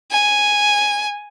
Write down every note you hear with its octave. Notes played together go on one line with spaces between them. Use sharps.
G#5